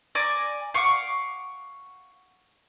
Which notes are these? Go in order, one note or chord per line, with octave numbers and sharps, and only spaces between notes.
D5 G#5 A#5 D6
F5 F#5 C#6 D6